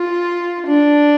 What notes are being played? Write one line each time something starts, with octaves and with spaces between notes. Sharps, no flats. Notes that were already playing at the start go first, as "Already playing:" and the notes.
Already playing: F4
D4